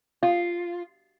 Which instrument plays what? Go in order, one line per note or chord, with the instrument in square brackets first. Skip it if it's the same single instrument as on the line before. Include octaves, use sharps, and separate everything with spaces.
[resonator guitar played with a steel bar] F4